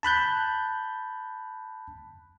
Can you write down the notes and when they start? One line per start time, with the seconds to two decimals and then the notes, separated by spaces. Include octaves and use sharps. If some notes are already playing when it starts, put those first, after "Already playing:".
0.03 A5 B5 F#6 G6